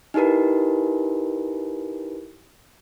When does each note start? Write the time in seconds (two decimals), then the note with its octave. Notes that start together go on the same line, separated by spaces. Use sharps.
0.14 D#4 E4 G4 A#4 B4